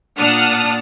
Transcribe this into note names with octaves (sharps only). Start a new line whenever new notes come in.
A#2 D4 F#5 A5 D#6 F6